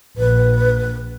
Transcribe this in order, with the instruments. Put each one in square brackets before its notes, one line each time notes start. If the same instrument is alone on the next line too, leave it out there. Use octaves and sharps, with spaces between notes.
[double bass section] A#1 [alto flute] B4